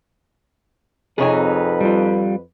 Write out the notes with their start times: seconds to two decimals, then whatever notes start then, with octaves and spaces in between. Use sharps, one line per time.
1.18 F2 C3 D#4 G#4 B4 C#5 G#5
1.81 G3 F4